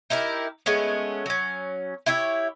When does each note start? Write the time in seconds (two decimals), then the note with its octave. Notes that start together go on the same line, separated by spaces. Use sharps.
0.10 D#4 E4 G4 A#4
0.66 G#3 A3 B3 C#4
1.26 F#3 C#4
2.06 E4 G4 C#5 E5